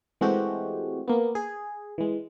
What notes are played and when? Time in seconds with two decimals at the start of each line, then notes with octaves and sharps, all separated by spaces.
0.21 E3 G#3 A3 C4 F#4 G4
1.08 A#3 B3
1.35 G#4
1.98 E3 G#3